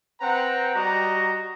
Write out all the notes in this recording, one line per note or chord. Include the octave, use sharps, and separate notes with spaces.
C4 B4 F#5 G5 A#5
G3 F#4 D#5 A#5